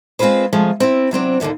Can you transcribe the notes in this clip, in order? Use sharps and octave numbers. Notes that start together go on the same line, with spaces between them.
G#3 C4 F4 G#4 B4 C5
C3 F3 G#3 A3
C4 E4
C3 F#3 C4 D4
D#2 A#2 D3 E3 F3